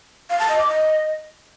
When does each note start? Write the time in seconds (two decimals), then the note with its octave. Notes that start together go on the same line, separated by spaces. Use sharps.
0.30 F5
0.39 A5
0.49 D#5
0.58 D6
0.68 D#5